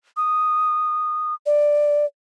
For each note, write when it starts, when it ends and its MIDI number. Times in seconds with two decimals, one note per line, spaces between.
0.17 1.34 87
1.46 2.05 74